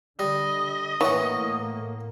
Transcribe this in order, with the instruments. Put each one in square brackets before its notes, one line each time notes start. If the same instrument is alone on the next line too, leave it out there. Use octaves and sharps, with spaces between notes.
[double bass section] D3 [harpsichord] G3 [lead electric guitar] D#5
[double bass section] A2 A#3 [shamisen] E3 [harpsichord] C#5 F#5